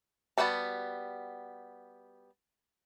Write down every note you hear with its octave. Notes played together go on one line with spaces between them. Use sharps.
G3 B3 F#4 A4 A5